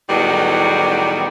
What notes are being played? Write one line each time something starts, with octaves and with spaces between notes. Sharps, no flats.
E2 A2 D#3 F#3 G3 B3